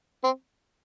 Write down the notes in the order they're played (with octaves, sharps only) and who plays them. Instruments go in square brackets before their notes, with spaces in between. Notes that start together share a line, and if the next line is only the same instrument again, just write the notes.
[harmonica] C4